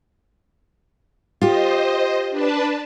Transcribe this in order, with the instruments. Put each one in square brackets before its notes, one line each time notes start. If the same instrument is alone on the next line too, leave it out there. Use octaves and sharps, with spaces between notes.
[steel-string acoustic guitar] F4 G4 [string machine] C5 D#5
[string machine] D4 B4 A5